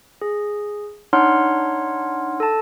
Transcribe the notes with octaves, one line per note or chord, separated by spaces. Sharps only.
G#4
D4 D#4 C#5 F#5 C6 F6
A4 A5